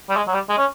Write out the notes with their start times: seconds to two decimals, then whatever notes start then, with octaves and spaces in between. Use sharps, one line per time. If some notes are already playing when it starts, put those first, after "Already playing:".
0.10 G3
0.17 G#3
0.27 F#3
0.34 G3
0.49 G#3
0.58 C#4